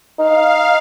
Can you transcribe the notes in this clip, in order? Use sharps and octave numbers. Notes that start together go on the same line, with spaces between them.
D#4 F5